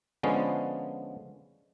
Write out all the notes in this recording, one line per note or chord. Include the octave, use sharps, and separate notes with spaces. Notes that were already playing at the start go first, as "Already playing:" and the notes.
D3 F3 G#3 B3 C#4